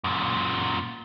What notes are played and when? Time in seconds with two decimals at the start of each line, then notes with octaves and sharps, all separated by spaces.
0.04 F#2 A#2